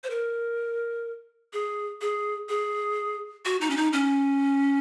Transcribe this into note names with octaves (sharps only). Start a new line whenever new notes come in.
C5
A#4
G#4
G#4
G#4
F#4
D#4
C#4
D#4
C#4